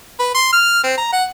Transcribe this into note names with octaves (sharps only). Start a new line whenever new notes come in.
B4
C6
F6
C4
A#5
F#5